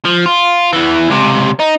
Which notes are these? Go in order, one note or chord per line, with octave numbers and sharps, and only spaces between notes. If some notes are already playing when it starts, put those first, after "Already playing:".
F3
F4
E2 E3
C#2 C3
D#4